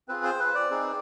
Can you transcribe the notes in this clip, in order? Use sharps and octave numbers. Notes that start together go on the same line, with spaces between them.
C4 F4 G#4 B4
C5
B4
D5
C4 D#4 G#4